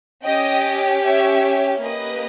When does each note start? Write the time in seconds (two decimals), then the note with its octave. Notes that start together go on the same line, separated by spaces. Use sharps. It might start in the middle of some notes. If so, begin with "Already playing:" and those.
0.23 C#4 G4 D#5 G5
1.03 C#5 E5
1.82 A#3 C#4 G4 B4 D#5